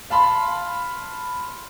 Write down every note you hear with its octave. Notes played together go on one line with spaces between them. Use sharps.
F5 A5 B5 C6